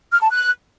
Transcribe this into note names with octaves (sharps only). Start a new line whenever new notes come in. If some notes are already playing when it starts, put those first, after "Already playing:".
F6
A5
F#6